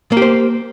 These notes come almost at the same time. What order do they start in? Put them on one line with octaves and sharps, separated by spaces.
A#3 G4 C5